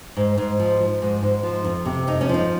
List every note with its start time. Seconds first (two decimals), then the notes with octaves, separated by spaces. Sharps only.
0.17 G#2
0.38 G#2
0.59 F3
0.80 F3
1.02 G#2
1.23 G#2
1.43 F3
1.64 F2
1.86 C3
2.07 F2 D#4
2.21 C#4
2.29 F3
2.34 D#4